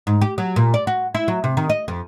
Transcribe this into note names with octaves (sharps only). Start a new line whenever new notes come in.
G#2
G4
F#3
A#2
D5
F#4
E4
F#3
C3
D#3
D#5
F2